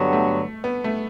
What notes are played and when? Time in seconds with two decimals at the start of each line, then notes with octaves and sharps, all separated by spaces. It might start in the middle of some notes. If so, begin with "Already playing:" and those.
Already playing: G2 D3 F#3 B3
0.13 A3
0.64 B3
0.84 A3